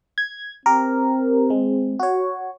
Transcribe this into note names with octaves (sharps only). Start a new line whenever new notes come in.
G#6
C4 G4 A#4
G#3
F#4 C#5